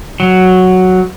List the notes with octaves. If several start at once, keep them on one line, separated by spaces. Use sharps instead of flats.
F#3